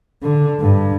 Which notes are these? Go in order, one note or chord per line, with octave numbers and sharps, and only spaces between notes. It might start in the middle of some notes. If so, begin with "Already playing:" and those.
D3
G2